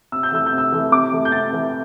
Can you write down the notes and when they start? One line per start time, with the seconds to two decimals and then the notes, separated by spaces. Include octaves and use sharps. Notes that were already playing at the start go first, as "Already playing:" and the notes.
0.12 C3 E6
0.23 G6
0.32 E3 A3 E6
0.46 G6
0.52 C3
0.58 E6
0.72 E3 A3
0.92 C3 D6
1.12 E3 A3
1.25 G6
1.32 C3 A6
1.53 E3 A3